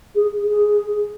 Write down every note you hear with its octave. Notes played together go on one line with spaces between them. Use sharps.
G#4
G#4